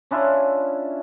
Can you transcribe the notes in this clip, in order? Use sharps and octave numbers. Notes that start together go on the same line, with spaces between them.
C#4 D4 E4 F4